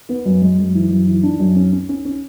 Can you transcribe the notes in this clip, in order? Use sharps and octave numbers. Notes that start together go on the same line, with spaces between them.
B3
F#2
G#3
F#2
E3
F#2
E3
D4
F#2
C#4
C#4
C#4
C#4